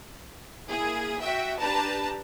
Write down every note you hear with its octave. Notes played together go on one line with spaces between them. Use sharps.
A#3 E4 G#4
F#4 E5 G5
D4 G4 B4 A5 A#5